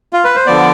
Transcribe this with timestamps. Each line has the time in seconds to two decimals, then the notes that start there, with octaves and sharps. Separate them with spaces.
0.13 F4
0.24 B4
0.36 C5
0.46 D3 F3 B3 D5